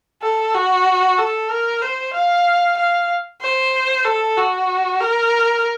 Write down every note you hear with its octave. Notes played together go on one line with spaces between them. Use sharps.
A4
F#4
A4
A#4
C5
F5
F5
C5
A4
F#4
A#4